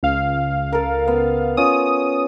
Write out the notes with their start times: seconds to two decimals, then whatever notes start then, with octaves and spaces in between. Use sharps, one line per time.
0.03 C#2 F5
0.72 A4 A#4
1.08 B3
1.57 C#4 F4 D#6